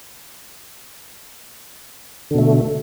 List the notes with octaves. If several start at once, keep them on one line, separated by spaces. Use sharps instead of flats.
B2 D3 A3